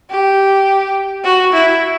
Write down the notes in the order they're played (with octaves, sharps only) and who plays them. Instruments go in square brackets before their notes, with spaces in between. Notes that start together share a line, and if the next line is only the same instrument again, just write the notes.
[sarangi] G4
F#4
E4